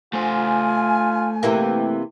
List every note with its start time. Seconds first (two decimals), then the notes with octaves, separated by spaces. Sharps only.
0.13 A3 F4 C5 G#5
1.43 C3 E3 A#3 G4